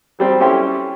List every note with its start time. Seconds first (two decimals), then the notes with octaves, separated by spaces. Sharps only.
0.19 F#3 G3 C4 G4
0.40 C#4 E4 G4 A4 G5 C6